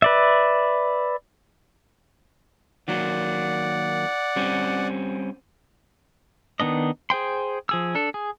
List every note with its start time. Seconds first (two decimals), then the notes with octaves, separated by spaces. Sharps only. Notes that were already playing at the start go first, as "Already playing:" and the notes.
0.02 B4 D5 E5
2.88 D#3 F#3 A#3 D5 F#5
4.36 G3 C4 C#4
6.60 D#3 B3 D4 D#5
7.10 G#4 C5 G5 C6
7.69 F3 G#4 E6
7.95 D4 A4
8.14 G#4